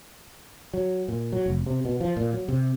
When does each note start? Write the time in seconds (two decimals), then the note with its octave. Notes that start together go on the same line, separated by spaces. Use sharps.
0.74 F#3
1.08 A#2
1.32 F#3
1.46 F1
1.66 C3
1.85 B2
2.01 F3
2.17 A#2
2.33 F#3
2.48 C3